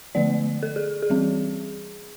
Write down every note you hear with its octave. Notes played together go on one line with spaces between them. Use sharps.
D3 F3 A3 D5
A4
G#4
G#4
E3 G3 C4